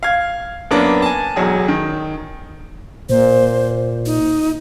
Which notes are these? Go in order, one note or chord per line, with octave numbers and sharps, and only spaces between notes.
F5 G#6
F#2 A#3 B3 D4
G#5 A5
E1 B1 F#3 G#4
D#3
A#2 C5
D#4